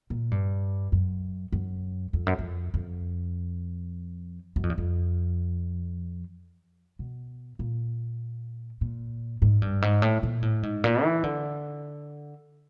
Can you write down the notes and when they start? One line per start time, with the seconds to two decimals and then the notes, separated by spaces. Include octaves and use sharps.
0.10 A#2
0.31 G2
0.92 F#2
1.53 F#2
2.13 F2
2.27 F#2
2.39 F2
2.74 F2
4.56 F#2
4.63 F2
4.70 E2
4.78 F2
6.99 B2
7.59 A#2
8.81 A#2
9.42 G#2
9.62 G2
9.82 G#2
10.02 A2
10.23 A#2
10.42 A2
10.63 G#2
10.84 A#2
11.04 E3
11.24 D3